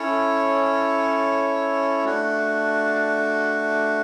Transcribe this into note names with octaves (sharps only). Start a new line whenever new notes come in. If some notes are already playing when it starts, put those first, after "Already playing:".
Already playing: C#4 E4 A4 C#5
A3 D4 F#4